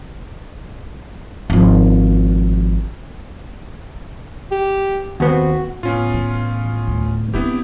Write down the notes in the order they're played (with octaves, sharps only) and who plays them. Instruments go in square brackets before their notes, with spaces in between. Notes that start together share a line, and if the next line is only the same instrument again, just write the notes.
[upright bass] G#1 F3
[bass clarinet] G4
[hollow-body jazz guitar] D#2 B3 C4 [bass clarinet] F#4
[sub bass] A2 [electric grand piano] B3 C#4 F4
[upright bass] E3
D2
[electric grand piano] B3 E4 G4 [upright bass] C4 D4